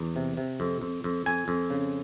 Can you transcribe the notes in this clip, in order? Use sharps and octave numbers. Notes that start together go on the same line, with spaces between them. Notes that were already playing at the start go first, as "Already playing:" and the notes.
Already playing: E2
C3
C3
F2
F2
F2
F2 G#5
F2
C#3